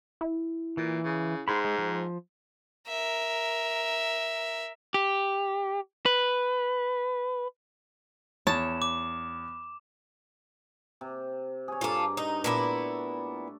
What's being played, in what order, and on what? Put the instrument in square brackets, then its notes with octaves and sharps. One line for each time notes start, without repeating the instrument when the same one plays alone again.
[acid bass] E4
[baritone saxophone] A#2 [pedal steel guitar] E3
[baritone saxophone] C#3
[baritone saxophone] G#2 [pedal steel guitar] B5 C6
[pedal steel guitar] G#3
F3
[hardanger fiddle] A#4 E5
[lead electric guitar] G4
B4
[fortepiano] E2 [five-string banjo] C#5 [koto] A5 [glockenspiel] E7
[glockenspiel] D6
[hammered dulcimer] C3
G#4 C#5
[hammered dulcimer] G2 A#5 D6 [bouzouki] F4 A4
[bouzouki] D#4
[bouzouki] A#2 B3 E4 [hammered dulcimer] A3 D4 A4